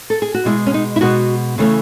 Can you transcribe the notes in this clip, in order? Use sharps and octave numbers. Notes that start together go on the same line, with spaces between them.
A4
G#4
F#4
B2 G#3 B3 E4
C#4
D#4
E4
B2 G#3 B3 F#4
C#3 E3 A3 C#4